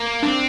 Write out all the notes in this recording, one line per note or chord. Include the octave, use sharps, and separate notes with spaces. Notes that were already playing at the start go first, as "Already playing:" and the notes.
Already playing: A#3
C4 D4